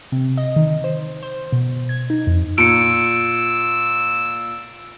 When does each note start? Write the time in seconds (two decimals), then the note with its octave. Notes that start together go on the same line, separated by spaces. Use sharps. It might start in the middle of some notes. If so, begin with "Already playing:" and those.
0.12 C3
0.37 D#5
0.56 D#3
0.84 C5
1.23 C5
1.52 B2
1.89 G#6
2.10 D#4
2.27 F2
2.58 A#2 E6 C#7 D7